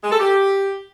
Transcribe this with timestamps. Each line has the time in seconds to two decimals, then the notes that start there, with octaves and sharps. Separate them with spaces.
0.04 G#3
0.12 A4
0.20 G4